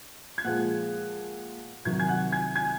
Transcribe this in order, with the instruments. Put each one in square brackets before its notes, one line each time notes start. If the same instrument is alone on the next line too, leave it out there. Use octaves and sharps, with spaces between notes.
[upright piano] G#6
A#2 F3 G#3 F#5 F#6
C2 C3 D#3 F#3 G#6
G#5 G#6
F#5 F#6
G#5 G#6
G#5 G#6